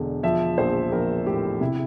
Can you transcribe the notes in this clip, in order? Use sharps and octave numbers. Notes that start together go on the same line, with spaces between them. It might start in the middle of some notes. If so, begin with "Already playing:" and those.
Already playing: E1 D3
F3 E5
A#1 C5
A#1 A#4
A2 G4
C3 E4